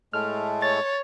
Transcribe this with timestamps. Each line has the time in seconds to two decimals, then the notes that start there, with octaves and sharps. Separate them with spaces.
0.13 A2 G#3 A3 F6
0.62 C#5 A6